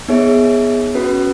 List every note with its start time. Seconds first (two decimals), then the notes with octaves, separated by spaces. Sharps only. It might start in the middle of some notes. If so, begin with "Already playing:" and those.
0.08 B3 D#4 G#4 C#5 E5
0.95 C#4 F#4 B4